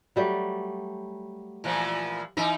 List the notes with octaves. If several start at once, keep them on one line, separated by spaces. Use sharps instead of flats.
F#3 G3 A3
A#2 E3 F3
E3 D#4 E5